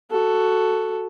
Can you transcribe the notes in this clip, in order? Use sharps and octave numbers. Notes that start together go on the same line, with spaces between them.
F#4 A4